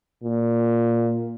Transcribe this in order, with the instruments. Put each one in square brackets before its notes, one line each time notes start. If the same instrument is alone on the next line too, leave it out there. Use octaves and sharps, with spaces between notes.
[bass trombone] A#2